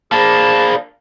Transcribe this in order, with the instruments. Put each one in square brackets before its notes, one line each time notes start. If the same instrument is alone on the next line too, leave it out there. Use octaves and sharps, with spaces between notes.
[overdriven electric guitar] A#3 D4 [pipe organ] G#4 C5 B5 [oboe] A5